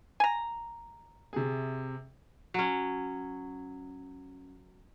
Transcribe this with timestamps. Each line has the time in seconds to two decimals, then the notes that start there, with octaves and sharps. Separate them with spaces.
0.20 G#5 A#5
1.33 C3 G#4
2.54 F#3 C#4